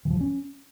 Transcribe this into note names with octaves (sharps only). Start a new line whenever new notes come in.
E3
F3
G3
C#4